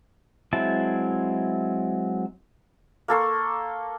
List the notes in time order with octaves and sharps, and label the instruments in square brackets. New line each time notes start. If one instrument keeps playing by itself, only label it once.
[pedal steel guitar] F#3 G#3 C4 E4 A5
[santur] A#3 A4 C6 C#6